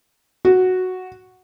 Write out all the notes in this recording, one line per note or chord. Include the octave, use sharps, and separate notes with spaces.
F#4